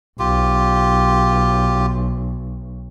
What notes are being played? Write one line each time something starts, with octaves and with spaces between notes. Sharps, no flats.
B1 F4 G4